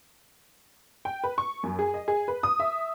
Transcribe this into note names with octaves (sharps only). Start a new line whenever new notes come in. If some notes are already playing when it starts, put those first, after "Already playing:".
G5
B4
C#6
F#2
G#4
D#5
G#4
B4
D#6
E5